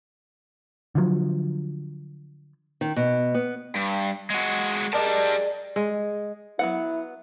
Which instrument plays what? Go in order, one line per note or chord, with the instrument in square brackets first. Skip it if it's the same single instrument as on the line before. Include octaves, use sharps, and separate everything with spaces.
[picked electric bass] D3 F3 F#3
[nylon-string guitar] D#3
B2
B3
[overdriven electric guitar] G2
G#3 F#4
[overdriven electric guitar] G3 A5 [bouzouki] G#3 D4 A#4
[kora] G#3
[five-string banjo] F#3 B3 F#5 [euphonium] E4